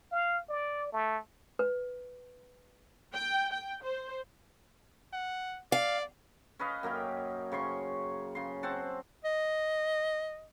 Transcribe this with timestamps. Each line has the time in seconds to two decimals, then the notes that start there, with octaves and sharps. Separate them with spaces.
0.12 F5
0.49 D5
0.92 A3
1.59 B4
3.15 G5
3.53 G5
3.85 C5
5.13 F#5
5.72 D5 F5
6.59 C#4 B4 D#5 F5
6.83 F#2 A#3 A#4 G5
7.52 C#3 C#5 C6 C#6
8.35 C#3 C6
8.63 C4 C5 F#5 A5
9.25 D#5